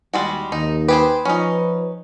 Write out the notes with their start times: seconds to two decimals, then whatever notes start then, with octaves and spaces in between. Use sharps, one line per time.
0.13 D#2 G3 G#3 F#4
0.52 D#2 D#4
0.88 G4 G#4 B4 C5
1.25 F3 C#4 D#4